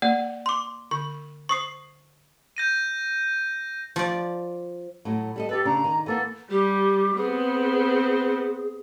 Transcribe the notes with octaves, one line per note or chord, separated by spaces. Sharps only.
A#3 D5 F#5
C6 D6
D3 C#6
C5 C#6 D#6 C7
G6 A#6 D#7
F3 D5
A2 F#3
G3 A4 D#5
G4 A4 B4
C#3 D4 A#5
D#3
E3 A#3 B3 A4
G3 G4
B3 C4 G#4